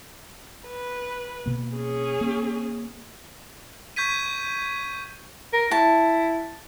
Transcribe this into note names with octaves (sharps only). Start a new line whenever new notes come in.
B4
B2 A#3
C#4 G#4
A#3
C#6 G6 G#6 B6 D#7
A#4
E4 A5